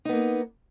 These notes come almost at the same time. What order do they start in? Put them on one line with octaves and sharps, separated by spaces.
D#4 B3 A#3